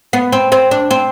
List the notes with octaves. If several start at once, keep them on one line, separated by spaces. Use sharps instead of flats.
B3
C4
C4
D4
C4